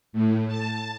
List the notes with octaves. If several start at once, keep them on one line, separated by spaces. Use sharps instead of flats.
A2
A5